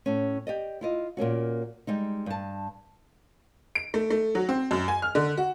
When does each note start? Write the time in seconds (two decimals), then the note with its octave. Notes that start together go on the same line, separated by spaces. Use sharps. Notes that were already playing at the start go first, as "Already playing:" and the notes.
0.06 A2 C#4
0.47 G4 D5 D#5
0.81 E4 F4 D#5
1.17 A#2 A#3 C#4 F#4
1.87 G3 G#3 D#4
2.26 G2 A5
3.75 D7
3.94 A3
4.10 A3
4.35 F#3
4.49 C4
4.71 F#2
4.88 G#5
5.02 F6
5.15 D3
5.37 F#4